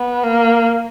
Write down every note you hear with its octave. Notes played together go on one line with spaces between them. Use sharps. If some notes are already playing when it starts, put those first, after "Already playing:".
Already playing: B3
A#3